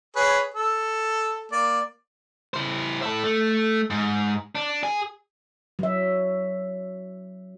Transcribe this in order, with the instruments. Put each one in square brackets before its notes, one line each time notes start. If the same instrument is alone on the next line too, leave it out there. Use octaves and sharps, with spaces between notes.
[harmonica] G#4 B4 C#5
A4
A#3 D5
[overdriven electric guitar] E4 C5
E4 A4
A3
G#2
D4
G#4
[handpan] F#3 E5